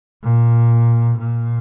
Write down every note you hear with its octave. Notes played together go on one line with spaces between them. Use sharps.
A#2
A#2